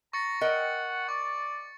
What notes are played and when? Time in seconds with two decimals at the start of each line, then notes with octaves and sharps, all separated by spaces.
0.13 A#5 C#6 A6 C#7
0.41 A#4 D#5 F#5 G5
1.09 D5 C#6